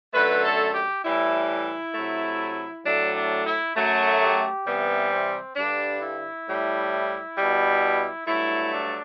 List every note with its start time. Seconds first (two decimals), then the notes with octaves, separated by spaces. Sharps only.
0.14 F#2 D3 A3 B4
0.44 A4
0.74 G4
1.04 A2 E3 G3 E4
1.94 C3 F#3 A3
2.85 A2 F#3 A3 D4
3.15 D4
3.45 E4
3.76 F#2 F#3 A3
4.21 G4
4.65 C3 E3 G3 B3
5.11 C4
5.55 G2 D3 G3 D4
6.01 E4
6.47 A2 G3
7.37 B2 G3
8.27 G2 F#3 A3 E4
8.72 D4